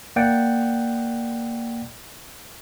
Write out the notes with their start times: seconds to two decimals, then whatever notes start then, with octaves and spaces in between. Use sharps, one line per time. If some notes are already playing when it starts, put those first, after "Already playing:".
0.16 A#3 D5 F#5 G5